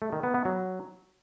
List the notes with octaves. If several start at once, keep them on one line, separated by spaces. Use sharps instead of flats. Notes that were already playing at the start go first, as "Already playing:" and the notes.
A3
D#3
B3
B3
F#3